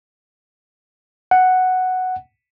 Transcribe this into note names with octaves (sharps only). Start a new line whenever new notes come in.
F#5